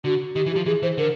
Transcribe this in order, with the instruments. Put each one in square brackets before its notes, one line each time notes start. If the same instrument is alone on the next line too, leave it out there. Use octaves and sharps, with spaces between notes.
[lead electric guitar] D3 [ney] F#4
[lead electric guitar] D#3 [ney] G4
[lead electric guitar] E3
[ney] G4
[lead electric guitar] F3
[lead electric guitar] E3 [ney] G#4
[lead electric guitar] E3 [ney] C5
[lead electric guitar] D3 [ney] A#4